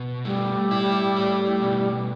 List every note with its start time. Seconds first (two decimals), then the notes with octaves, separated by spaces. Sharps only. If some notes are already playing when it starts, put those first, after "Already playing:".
Already playing: B2
0.25 G3 A3
0.71 E4
1.16 A3
1.62 B2
1.98 G3